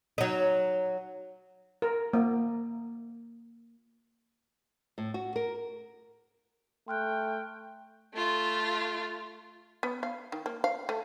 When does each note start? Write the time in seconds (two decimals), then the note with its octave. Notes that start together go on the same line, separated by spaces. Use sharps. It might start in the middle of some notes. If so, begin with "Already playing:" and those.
0.18 F#3 D#4
1.82 A#4
2.13 A#3
4.98 A2
5.14 F#4
5.36 A#4
6.88 A3 G5 C6 F6 F#6
8.14 A3 F4
9.83 B3
10.03 F5
10.32 D#3
10.46 A#3
10.64 F5
10.89 A3